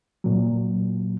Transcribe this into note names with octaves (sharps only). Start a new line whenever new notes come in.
A#2 F#3